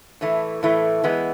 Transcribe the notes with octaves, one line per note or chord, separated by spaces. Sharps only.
A2 E3 A3
A2 E3 A3
E3 G#3 B3